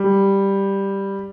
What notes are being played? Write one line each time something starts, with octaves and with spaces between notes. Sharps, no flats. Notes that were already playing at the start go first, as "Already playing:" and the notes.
Already playing: G3